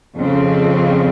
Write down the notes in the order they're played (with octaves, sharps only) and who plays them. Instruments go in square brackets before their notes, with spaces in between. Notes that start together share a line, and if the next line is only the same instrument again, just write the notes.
[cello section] F2 C#3 F3 C4